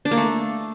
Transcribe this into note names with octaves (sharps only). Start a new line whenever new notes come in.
D4
A#3
A3